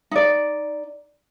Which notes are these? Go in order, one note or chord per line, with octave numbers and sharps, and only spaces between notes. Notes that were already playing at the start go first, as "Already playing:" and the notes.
D#4 D5